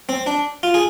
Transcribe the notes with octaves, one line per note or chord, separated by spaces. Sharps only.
C4
D4
F4
G#4